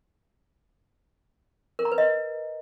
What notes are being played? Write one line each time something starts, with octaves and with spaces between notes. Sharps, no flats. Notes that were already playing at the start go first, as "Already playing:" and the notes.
A#4
A#5
B4
D#5